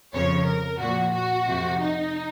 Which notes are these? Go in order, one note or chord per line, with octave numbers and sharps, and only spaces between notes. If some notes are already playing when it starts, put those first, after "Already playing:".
F2 C#3 F3 C#5
A#4
A#2 F3 F#4
F#4
F2 C3 F3
D#4